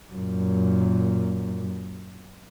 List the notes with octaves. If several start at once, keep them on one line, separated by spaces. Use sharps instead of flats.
F#2 A#2